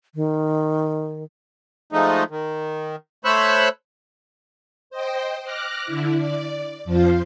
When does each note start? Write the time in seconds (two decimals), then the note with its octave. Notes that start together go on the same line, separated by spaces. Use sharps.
0.15 D#3
1.92 F3 G#3 A3 D#4
2.30 D#3
3.25 A3 C5 C#5 B5 E6 F#6
4.90 C5 D#5 G5
5.44 D6 F6 F#6 A#6
5.86 D3 E4
6.16 D5
6.85 F2 F3 F4 C5